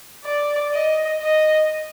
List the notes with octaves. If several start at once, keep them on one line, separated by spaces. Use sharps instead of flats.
D5
D#5
D#5